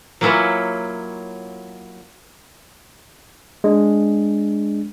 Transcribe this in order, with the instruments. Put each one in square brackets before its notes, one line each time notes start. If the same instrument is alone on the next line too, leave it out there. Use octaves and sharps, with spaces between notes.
[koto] F#3 A#3 C#4 E4 F4
[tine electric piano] G#3 D4